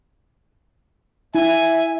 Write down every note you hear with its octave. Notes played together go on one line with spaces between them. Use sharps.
E4 E5 G#5